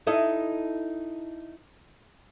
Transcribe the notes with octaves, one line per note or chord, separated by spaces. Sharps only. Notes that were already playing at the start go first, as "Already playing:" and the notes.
D#4 E4 A4 D#5